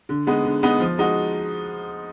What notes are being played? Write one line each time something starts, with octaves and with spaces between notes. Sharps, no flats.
D3
G#3 B3 D#4
D3
G#3 B3 D#4
F3
G#3 D#4 F#4